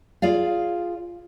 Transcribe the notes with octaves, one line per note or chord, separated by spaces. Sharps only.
F4 G#4 D5 F5